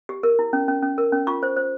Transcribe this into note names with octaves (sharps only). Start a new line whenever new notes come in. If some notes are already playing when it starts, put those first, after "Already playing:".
G4
A#4
E4
C#4
C#4
C#4
A#4
C#4
F4 C#6
C5
C5